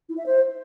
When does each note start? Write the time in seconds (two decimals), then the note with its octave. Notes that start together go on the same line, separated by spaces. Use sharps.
0.09 E4
0.17 E5
0.26 C5